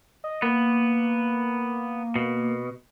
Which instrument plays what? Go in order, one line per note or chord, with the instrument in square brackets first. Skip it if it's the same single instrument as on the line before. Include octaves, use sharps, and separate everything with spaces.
[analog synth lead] D#5
[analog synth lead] A#3 [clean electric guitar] B3
[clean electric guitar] B2